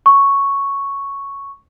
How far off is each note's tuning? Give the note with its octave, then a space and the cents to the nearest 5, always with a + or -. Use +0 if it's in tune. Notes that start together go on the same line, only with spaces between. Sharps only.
C#6 +0